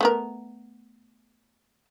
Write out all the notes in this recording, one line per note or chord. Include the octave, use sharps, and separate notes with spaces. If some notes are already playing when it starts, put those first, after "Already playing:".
A3 B3 A#4